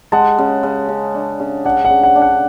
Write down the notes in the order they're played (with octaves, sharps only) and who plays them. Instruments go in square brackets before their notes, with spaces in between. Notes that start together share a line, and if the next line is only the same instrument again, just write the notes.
[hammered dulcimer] G#3 [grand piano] F#5 A5
[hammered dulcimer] C#3
C#3
C#3
D4
C#3
[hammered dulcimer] D4 [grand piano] F#5
[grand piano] F#5
[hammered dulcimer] C#3
[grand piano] F#5
[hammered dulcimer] D4
[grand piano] F#5